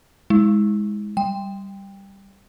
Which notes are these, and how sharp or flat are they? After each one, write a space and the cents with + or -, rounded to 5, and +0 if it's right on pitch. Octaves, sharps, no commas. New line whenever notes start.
G#3 +0 E4 -30
G3 +0 G5 +15